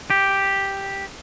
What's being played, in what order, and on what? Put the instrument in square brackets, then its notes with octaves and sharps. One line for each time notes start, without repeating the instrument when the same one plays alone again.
[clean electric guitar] G4